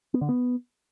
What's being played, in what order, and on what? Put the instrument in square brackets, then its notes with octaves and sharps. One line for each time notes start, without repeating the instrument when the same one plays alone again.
[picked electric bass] B3
D3
B3